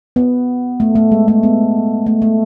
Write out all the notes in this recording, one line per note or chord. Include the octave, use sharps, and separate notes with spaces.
B3
A3
A3
G#3
A3
B3
A3
A3